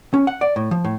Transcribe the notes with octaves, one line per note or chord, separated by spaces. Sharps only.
C#4
F#5
D5
A2
F3
A2